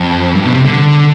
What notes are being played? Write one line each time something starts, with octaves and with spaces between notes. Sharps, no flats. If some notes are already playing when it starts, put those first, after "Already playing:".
Already playing: F2
G2
B2
C3
D3